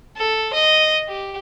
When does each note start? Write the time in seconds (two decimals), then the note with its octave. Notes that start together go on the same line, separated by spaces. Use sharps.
0.17 A4
0.53 D#5
1.08 G4